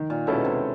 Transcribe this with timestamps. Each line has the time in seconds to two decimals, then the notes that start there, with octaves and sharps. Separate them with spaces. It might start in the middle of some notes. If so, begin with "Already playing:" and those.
Already playing: D#3
0.10 A#2
0.27 B2 G#3 C#4 E4 A4
0.45 C3